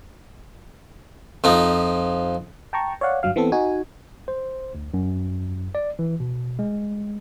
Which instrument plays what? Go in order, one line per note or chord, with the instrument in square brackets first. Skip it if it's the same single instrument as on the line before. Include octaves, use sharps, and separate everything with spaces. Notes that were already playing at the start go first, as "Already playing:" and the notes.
[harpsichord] F2 F3 D#4
[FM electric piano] G5 A5 A#5 C#6
C#5 D5 F5 F#5
G1 G2 F#3 F5
E3 B3 C4 A4
D#4 F#4 G#5
[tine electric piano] C5
D2
F#2
D5
E3
B2
G#3